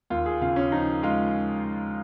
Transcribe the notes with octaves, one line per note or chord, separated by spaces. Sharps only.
D#2 F4
G#4
C#3 F4
C#4
F3 D#4
G#3 F4